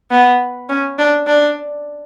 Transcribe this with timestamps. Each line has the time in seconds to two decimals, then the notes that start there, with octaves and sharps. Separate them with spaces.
0.11 B3
0.69 C#4
0.99 D4
1.27 D4